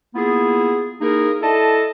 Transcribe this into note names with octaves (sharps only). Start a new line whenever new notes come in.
A#3 B3 E4 F4 G#4
A#3 D#4 E4 G#4 A#4
E4 A4 D5 D#5 A5